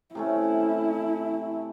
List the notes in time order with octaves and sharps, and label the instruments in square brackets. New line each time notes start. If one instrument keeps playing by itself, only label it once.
[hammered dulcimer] C3 A3 C#4 [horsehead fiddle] E4